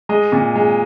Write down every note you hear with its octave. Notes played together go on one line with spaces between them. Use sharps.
G#3 D#5
A#2
G#3